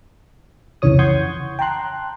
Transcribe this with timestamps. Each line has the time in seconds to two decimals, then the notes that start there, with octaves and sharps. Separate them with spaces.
0.82 C2 F2 C#3 E3 C#5 D#6
0.99 F#5 C6 C#6 D#6 G6 G#6
1.59 G5 A5 A#5 C6 F#6